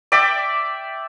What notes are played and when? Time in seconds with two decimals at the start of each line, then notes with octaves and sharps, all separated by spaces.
0.12 D5 E5 G5 D6